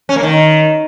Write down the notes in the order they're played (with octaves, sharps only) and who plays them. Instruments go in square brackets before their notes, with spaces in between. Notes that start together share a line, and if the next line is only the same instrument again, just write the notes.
[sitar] C#4
A#3
D#3